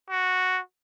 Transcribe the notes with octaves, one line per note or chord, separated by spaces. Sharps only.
F#4